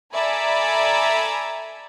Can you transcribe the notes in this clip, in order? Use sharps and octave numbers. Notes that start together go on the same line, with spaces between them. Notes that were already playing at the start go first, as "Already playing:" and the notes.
A4 D5 E5 G#5 A#5 B5